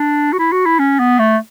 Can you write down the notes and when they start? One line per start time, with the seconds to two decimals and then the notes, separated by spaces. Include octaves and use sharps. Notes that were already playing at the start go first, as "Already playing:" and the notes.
Already playing: D4
0.33 F#4
0.39 E4
0.52 F#4
0.66 E4
0.79 C#4
0.99 B3
1.19 A3